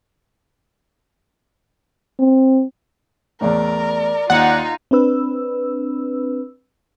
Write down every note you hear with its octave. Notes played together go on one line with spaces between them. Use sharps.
C4
E2 A2 A#4 D5
D#2 D#4 F4 F#5
C4 D4 B4 E6